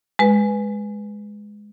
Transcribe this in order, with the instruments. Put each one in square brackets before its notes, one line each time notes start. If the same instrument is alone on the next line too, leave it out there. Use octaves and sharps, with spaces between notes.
[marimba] G#3 B4